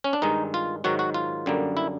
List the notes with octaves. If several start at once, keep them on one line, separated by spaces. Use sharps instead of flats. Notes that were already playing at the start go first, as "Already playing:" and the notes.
C#4
D4
G2 D#3 G#3 D#4
F4
G#2 D#3 F#3 F#4
F#4
F4
F#2 D3 G3 A#3
E4